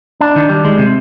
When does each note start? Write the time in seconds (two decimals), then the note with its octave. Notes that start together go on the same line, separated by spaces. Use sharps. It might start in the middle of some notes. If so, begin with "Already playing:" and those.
0.21 D4
0.36 D#3
0.49 G3
0.65 G#3
0.78 C3